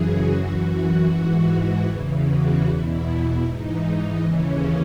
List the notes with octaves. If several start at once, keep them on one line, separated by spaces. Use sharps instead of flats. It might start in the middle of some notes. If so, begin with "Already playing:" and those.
Already playing: F#2 C#3 E3 F#4 G#4
F#2 E3
F#4
G#2 E3
E2 C#3 E3
F#4
E2 B2 E4
G#2 E3 D#4
D#2 C#3 E3 C#4